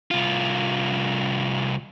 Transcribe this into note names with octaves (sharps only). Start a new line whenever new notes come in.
C2 F4